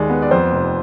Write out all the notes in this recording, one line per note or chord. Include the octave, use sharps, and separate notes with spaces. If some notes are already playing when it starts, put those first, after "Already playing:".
Already playing: D#2 D#3 G#3 D5
B3
D5
F2 C5
F1